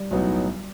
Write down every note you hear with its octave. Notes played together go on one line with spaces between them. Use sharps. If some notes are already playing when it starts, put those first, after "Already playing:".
Already playing: G3
B1 A2 F#3 B3 D#4